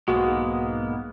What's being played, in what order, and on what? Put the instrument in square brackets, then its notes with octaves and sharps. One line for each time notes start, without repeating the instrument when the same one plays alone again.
[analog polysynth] B1 G#2 [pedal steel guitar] G#3 A#3 B3 [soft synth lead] F#4